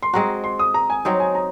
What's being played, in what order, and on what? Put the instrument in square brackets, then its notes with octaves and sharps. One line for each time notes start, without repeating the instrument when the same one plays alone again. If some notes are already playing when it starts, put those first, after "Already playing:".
[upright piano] C6
[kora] G#3 C4 F#4 [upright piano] A#5
[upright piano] C6
D#6
A#5
G#5
[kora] F#3 C4 D#4
[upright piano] G#5
A#5